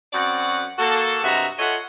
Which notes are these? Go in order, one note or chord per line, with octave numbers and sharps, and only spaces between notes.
F#2 C4 F#4 D5 F#5
A#3 F#4 A4
G2 C3 G#3 F#4 E5 A#5
F4 A4 C#5 D#5 E5 F#5